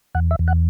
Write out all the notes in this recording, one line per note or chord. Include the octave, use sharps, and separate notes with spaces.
E2 F#5
E5
E2
F#5